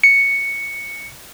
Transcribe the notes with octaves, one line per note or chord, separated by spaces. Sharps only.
C#7